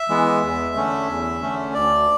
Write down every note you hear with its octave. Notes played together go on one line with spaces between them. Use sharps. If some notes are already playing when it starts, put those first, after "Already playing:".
Already playing: E5
E3 G#3 B3
E2
D3 A3 C#4
E2
D3 A3 C#4
D2 D5